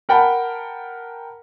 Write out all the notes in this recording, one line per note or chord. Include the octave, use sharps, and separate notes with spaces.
A#4 F#5 G5 A5 B5